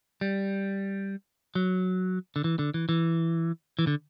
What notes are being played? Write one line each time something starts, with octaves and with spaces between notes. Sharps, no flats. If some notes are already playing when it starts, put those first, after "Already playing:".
G3
F#3
D3
E3
D3
E3
E3
E3
D3